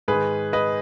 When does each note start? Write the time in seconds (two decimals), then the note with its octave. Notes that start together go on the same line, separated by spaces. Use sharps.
0.08 G#2 D#3 G#4 B4
0.53 B4 D#5